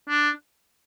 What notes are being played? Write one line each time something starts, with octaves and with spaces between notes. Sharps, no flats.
D4